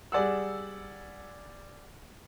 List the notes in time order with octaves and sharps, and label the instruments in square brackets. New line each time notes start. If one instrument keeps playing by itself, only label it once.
[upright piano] G3 G#4 D5 F#5 E6